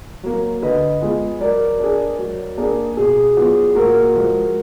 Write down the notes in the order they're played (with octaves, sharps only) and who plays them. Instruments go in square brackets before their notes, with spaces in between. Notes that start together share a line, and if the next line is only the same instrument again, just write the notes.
[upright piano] F#3 A#3
[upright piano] D3 [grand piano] B4 D#5
[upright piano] G#3 B3 F4 G#4
[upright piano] F#3 [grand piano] A#4 D5
[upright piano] D4 G#4
F#3
A#3 D4 G#4
[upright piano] B2 [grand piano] G#4
[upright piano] F#3 B3 F4
[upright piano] A#2 [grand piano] F#4 A#4
[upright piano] F3 G#3